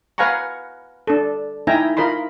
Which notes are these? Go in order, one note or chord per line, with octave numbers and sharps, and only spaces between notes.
B4 F5 F#5 G#5 A#5 C#6
D4 A4
D#4 E4 E5 G5 G#5 A#5
F4 A#4 D#5 B5 C6